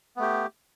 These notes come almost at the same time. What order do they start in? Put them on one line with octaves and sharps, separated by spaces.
B3 A3 G4